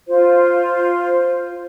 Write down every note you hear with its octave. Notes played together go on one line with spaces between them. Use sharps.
F4 C5